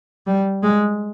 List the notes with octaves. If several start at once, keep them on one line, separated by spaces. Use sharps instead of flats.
G3
G#3